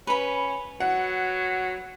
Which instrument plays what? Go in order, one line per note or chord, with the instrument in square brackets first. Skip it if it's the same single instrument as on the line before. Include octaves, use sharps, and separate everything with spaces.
[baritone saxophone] C#4 [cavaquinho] B4 B5
[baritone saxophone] F#3 [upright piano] F#5